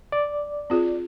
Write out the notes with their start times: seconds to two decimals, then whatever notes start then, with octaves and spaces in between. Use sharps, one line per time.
0.12 D5
0.70 C4 F4 G#4